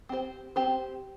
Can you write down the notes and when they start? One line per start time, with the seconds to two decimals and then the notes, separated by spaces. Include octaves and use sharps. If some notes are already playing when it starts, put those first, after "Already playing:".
0.09 C4 G4 C5
0.56 C4 G4 C5